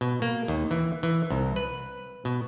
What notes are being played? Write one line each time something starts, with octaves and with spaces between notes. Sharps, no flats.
B2
A#3
D#2
E3
E3
C2
B4
B2